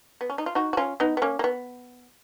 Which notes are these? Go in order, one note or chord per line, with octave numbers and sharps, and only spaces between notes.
B3
C#4
D#4
F4
D#4 F#4
F#4
C#4 F4
B3 D#4
B3
A#3 C#4
A#3
B3